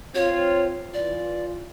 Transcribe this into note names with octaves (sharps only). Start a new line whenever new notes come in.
C4 F4 C#5
E3 F4 D5